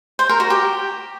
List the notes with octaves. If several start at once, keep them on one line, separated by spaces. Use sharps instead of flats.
C5
A#4
F#4
G4